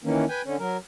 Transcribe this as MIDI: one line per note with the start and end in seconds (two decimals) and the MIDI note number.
0.04 0.25 51
0.04 0.25 52
0.04 0.25 58
0.04 0.25 61
0.29 0.42 71
0.29 0.42 79
0.29 0.42 80
0.45 0.56 50
0.45 0.56 61
0.59 0.77 54
0.59 0.77 70